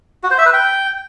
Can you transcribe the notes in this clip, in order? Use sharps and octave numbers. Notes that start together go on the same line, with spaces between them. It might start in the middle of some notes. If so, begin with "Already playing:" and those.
F#4
C5
E5
B4
G5